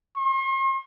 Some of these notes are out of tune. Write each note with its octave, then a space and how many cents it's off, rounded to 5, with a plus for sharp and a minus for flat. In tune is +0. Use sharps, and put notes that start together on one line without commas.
C6 +45